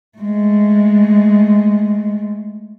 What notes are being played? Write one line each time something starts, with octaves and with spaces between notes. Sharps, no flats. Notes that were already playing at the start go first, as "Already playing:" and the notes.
G#3 A3